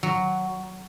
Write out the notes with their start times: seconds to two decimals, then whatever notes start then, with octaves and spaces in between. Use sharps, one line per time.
0.03 F#3